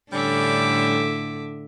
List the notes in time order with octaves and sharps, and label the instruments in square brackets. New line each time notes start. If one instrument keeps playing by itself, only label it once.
[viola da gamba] A2 D3 [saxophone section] G3 C#4 D4 [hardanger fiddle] E5 D6